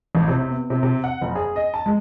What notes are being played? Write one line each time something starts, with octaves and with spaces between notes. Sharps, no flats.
A1
C3
B3
C3
C3
F#5
F#1
G#4
D#5
A5
G#3